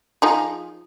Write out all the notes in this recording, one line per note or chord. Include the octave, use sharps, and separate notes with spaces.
F3 D#4 G#4